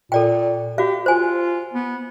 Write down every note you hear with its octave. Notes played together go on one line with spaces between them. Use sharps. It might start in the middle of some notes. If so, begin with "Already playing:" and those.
A#2 A4 D5 G5
F#4 G4 F5
F4 C5 G#5
B3